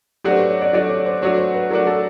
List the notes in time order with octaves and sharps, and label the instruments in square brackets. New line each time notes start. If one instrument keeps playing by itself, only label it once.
[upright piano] F#3 A3 D4 F#4 [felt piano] G4
[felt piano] C5
B4
C#5
D5
[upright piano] F#3 A3 D4 F#4 [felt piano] D5
[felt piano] C#5
C5
[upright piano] F#3 A3 D4 F#4 [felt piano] C#5
[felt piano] C5
B4
[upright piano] F#3 A3 D4 F#4 [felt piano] A#4
[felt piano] A4